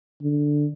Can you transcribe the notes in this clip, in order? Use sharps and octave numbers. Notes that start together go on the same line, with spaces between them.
D3